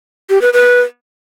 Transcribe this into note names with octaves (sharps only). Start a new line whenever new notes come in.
G4
B4
B4